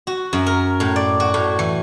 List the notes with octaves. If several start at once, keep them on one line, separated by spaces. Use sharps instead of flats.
F#4
F#2
A#4
A2
D5
F#4
A2
E3